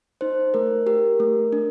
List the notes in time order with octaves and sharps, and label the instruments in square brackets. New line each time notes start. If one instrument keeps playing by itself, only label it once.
[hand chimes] D#4 C5
A3 A#4
G4 A#4
A3
D4